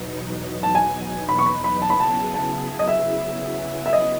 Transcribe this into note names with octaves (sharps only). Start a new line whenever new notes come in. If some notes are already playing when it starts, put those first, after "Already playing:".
Already playing: E2 B2 F#3 B3 D#4
A5
G#5
B5
C#6
B5
B5
C#3 F#3 B3 E4 G#4 A5
B5
A5
A5
D#5
E5
E5
D#5